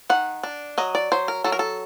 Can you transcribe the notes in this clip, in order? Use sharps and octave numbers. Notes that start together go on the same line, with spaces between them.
D#3 F#5
D4
F#3 D#5
D5
F#3 C5
A#4
F#3 A4
A#4
A4